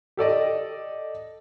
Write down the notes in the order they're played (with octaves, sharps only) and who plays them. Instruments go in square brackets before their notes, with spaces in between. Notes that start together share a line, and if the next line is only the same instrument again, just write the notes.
[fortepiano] G4 A4 D5 D#5